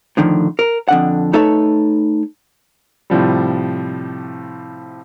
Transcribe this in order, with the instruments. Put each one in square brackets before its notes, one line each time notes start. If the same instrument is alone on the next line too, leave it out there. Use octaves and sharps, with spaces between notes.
[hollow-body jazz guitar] A2 D3 D#3 F3
A#4
F2 D3 F#5
A3 D#4 A4 B4 C#5 E5
[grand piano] A2 C3 F3 G3